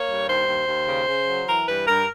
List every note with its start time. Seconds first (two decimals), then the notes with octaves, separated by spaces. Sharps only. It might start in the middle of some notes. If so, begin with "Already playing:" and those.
Already playing: A#3 C#5
0.09 G2
0.29 D#2 C5
0.48 D#2
0.68 D#2
0.88 C#3
1.08 C#3
1.28 F#3
1.48 E3 A#4
1.68 G2 B4
1.87 G2 A#4